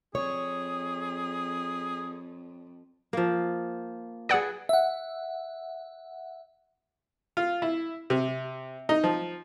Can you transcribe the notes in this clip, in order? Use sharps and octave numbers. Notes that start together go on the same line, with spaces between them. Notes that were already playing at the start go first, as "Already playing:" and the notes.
F2 G#4 C#5
F3 A#3
G#4 B4 D5 F#5 D#6
E5 F#5
F4
E4
C3
D#4
F3